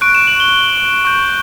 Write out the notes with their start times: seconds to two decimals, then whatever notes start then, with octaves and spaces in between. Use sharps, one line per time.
0.01 C#6 F#6 D7
0.15 E7
0.27 F#7
0.40 G7
1.05 C#6 G6